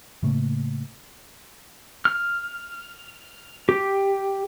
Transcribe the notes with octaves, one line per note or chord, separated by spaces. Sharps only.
A2 C#3 A3 A#3
F6
G4